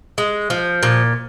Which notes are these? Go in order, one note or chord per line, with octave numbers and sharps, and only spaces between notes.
G#3
F3
A#2